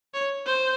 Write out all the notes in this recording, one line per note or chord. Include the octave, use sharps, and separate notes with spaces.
C#5
C5